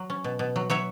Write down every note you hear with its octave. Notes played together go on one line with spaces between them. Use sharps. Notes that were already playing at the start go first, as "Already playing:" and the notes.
Already playing: F#3
C#4
B2
B2
F#3
F#3 C#5 E5